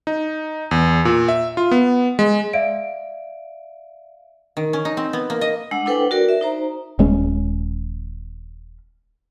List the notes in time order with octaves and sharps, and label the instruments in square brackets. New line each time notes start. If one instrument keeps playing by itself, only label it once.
[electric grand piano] D#4
E2
A#2
E5
F4
B3
G#3
[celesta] D5 E5 F5 D7
[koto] D#3
C#4
D#4
C4
B3
A#3
D#5
[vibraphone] G#3 D4 F#5 E6
D4 E4 A4 B4 C5 G5
F#4 A#4 D5
E5
D#4 C5 A#5
[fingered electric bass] D#1 G#3 C#4